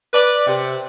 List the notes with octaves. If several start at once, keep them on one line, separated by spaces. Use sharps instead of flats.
B4 D5
C3